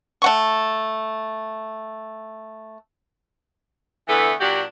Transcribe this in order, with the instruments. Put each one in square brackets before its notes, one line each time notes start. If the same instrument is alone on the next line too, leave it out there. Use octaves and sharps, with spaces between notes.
[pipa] A3 F#5 C#6
[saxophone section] D3 E3 A3 B3 A4 B4
A#2 F#3 D4 F#4 G4